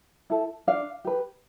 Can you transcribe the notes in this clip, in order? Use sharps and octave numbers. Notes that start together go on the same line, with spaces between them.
E4 A4
D4 F5
G4 B4